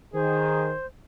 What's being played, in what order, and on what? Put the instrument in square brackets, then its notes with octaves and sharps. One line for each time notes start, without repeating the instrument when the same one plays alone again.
[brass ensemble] D#3 [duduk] G#4 [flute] C5